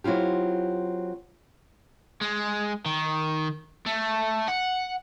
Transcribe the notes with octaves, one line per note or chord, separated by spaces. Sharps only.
F#3 C4 E4 F4 G4
G#3
D#3
A3
F#5